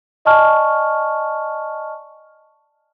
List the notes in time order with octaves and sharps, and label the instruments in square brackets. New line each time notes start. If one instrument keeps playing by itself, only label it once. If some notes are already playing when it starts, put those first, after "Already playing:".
[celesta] D5 D#5 G#5 A5 C#6 F6